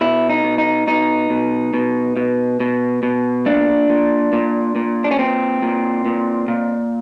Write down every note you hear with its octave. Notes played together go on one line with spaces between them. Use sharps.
B2 E4
D#4
B2
D#4
B2 D#4
B2
B2
B2
B2
B2
A#2 D4
A#2
A#2
A#2
D4
C#4
A#2 C4
A#2
A#2
A#2